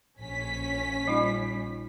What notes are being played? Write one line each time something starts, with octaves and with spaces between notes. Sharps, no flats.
A#1 C#4 B6
G3 D#4 F4